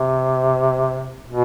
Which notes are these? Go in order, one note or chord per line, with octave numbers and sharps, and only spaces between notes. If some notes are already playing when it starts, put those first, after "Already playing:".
Already playing: C3
B2